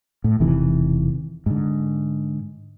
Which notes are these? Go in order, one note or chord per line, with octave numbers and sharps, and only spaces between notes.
A2
E1 C3 D#3 E3
G#2 D3